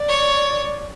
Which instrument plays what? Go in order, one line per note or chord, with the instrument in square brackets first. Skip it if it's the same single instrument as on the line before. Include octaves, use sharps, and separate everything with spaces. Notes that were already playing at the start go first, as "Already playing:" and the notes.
Already playing: [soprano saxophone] D5
[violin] C#5